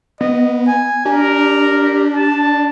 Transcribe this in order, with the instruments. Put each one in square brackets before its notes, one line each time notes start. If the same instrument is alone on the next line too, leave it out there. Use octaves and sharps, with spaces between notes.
[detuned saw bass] B3 [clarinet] D#5
[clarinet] G#5
[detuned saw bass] D4 [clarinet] G4 [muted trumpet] A#4
[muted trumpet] A5